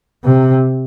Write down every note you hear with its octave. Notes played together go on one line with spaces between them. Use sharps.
C3